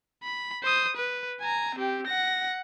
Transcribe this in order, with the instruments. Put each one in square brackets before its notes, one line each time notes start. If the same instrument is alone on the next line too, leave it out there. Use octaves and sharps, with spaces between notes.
[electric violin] B5
C5 D#6
B4
G#5 A#5
C4 G4
F#5 A#6